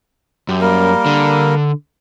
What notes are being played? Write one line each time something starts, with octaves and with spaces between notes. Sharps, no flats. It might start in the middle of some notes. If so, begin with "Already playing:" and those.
F#2 G4
G3 A#3 A#4
D3